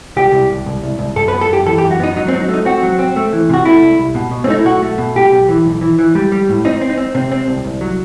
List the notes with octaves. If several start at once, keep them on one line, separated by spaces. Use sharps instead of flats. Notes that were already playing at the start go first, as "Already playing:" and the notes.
C2 G4
C2
C2
C2
C2
C2
F#2 A4
B4
B3
A4
F#2 G4
E3 A4
G4
F#2
F#4
B3 D#4
F#3 D#4
C4
F#3
D#4
A3
D#4
C4 F#4
F#3
C4
A3
E3
C3 F#4
A3 E4
C2
C2
B2
B2
C4
A3 D#4
E4
B1 F#4
A3
B2
B1 G4
B1
E3
B1
E3
E3
G3
G3
A2
C4 D#4
C4
D#4
C4
C3 C4
C4
C2
C2
F#3